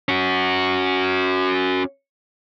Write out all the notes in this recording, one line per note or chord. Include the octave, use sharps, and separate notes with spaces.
C#4 F#4